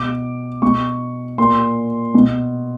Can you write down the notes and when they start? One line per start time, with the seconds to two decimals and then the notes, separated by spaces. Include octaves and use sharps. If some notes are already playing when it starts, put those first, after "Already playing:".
Already playing: B2 D6
0.62 B2 C#6
1.38 A#2 C6
2.14 B2